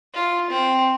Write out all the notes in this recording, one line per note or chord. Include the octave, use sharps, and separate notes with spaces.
F4
C4